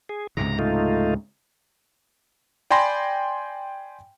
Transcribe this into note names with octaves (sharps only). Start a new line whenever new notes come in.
G#4
C#2 G#2 C3 A#5
A3 D#4 F4
D5 G5 G#5 B5 C6 A#6